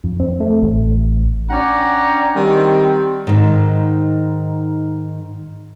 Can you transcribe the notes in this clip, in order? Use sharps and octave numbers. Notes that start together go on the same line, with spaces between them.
F2
C4
A3
A1
C#4 D4 D5 F#5 G5 A#5
D#3 G3 C4
G#2 D#3